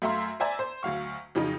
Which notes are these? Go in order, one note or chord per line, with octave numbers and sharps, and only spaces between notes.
F#2 A3 E5 F5 A#5 C6
C5 D5 E5 G#5 A#5
C5
D2 F#3 F5 C#6
F2 C#3 F3 F#3 D#4